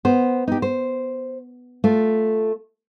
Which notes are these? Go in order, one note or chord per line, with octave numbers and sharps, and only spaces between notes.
B3 C5
D#4 G4
C5
A3 F4